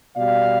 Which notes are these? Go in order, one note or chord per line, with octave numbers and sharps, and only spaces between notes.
B2 G3 D5 F5